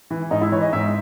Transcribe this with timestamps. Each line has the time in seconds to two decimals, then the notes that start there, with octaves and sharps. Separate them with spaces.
0.10 E3
0.31 G#2 D#4
0.42 E4
0.52 E3 C#5
0.62 D#5
0.73 G#2 E5